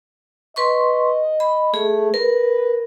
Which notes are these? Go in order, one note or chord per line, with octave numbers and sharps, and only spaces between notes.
B4 D#5 C6 C#6
B5
A3 G#4
A#4 B4